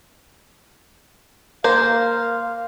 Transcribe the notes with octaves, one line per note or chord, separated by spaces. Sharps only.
A#3 A#4 C5 F5